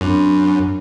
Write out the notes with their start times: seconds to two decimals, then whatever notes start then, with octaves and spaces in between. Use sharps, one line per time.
0.01 F#2 C4 D4 B5